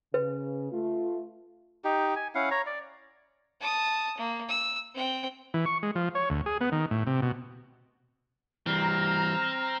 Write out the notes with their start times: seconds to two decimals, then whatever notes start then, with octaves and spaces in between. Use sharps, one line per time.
0.14 C#3 B4
0.72 A3 F4
1.84 D#4 G4
2.16 G#5
2.35 C#4 E4 F5 F#5
2.51 C#5 A#5
2.67 D5
3.61 A5 D#6
4.17 A#3
4.49 E6
4.94 C4 G5
5.54 E3
5.66 C#6
5.83 G#3
5.96 F3
6.15 C#5
6.30 D2
6.46 G#4
6.61 B3
6.72 D#3
6.91 A2
7.07 C3
7.22 B2
8.66 E3 G3 C4 A#5 F6